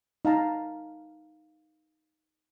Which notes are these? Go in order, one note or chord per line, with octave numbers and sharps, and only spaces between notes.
D#4 F5 A5 A#5